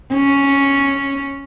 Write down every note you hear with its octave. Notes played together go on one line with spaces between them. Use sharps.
C#4